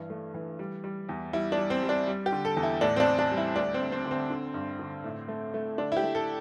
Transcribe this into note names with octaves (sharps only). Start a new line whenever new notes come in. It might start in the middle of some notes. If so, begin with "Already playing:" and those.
Already playing: G2 E3
A3
E3
G3
G3
E2
G3 E4
D4
G3
C4
G3
D4
G3
G4
D3
A4
E2
E4
A2 D4
C4
D4
A2
D4
G3
E4
D2 D4
C4
D2
C4
D3
C4
D3
G2
D3
A2
A3
A3
D3 D4
E4
G4
A3
A4